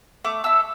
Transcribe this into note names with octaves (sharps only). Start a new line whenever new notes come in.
A3 D6
E4 A4 E6